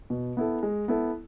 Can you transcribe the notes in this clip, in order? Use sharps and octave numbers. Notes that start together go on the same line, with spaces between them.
B2
B3 E4 A4
G#3
B3 E4 A4